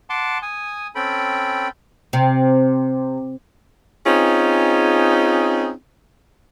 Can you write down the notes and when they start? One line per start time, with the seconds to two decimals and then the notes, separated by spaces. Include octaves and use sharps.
0.10 F#5 A5 C6 D6
0.42 G#5 D#6
0.95 C4 C#4 A4 G5 B5
2.13 C3
4.05 C4 C#4 D#4 F4 G#4